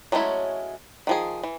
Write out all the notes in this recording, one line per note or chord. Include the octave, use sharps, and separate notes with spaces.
F#3 G#3 A3 C#4 E4
D#3 F3 G#4
E3